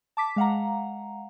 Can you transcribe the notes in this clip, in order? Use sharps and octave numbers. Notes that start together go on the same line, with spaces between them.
A5 D6 B6
G#3 F5 F#5 A#5